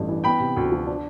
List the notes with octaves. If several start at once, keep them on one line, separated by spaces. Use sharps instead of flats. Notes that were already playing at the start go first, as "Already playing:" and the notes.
Already playing: A1 G2 A3 D4
E3
B3 G5 B5
C3
D2
F3
D4